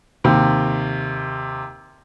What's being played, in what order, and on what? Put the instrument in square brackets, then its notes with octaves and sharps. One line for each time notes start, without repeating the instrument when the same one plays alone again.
[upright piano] D#2 C3